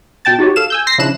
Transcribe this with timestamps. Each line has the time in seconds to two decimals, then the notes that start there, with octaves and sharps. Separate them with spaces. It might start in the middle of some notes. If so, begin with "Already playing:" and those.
0.25 B2 G5 A5 A6
0.39 D#4 F#4 G4 C#5
0.56 A4 F5 E7
0.70 G#5 E6 G6
0.87 C6 A#6 C7
0.98 C#3 F3 D4 E4 F#6 E7